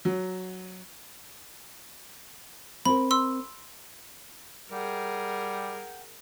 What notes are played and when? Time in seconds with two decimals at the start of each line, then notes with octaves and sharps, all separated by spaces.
0.05 F#3
2.85 C4 A#4 B5
3.11 C6 E6
4.71 G3 G#4 A#4 F#5 G5 G6